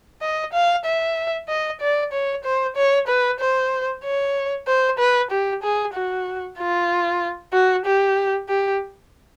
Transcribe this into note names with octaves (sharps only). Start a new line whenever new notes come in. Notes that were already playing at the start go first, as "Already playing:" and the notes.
D#5
F5
E5
D#5
D5
C#5
C5
C#5
B4
C5
C#5
C5
B4
G4
G#4
F#4
F4
F#4
G4
G4